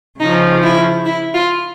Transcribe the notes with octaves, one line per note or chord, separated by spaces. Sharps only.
C#3 F3 D#4
E4
E4
F4